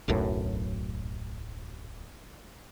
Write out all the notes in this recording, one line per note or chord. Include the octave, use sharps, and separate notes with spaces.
D1 B1 F#2 A2